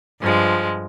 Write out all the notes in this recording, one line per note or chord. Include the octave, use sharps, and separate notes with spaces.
G2 F3 G#3